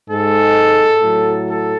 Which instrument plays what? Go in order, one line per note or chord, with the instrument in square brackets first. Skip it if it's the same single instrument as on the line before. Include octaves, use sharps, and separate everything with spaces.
[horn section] G#2 G#3 A4
A2 F#3
A4